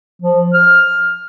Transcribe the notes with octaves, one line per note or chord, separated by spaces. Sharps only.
F3
F6